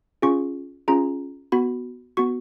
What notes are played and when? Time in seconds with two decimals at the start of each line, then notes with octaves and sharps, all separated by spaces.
0.22 C#4 F4 G#4 C#6
0.88 C#4 F4 G#4 A#5
1.52 B3 F#4 B5
2.17 B3 F#4 C#6